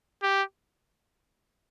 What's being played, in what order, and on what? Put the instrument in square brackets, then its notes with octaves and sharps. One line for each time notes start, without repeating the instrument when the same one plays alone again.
[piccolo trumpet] G4